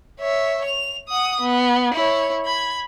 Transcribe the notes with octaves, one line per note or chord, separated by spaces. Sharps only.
C#5 E5
F7
F#5 D#6
B3
E4 C#5
B5 G#6